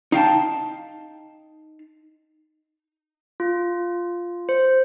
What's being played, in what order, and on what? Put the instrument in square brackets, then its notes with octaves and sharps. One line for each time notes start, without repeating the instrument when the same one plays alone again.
[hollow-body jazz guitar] D#4 F5 G5 A5
[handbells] F4
C5